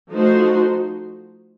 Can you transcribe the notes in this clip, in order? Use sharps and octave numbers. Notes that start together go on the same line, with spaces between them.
F3 A3 D#4 F#4 C5